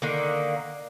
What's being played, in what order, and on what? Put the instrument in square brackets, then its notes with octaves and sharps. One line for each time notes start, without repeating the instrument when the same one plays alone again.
[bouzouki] D3 D#3 A#3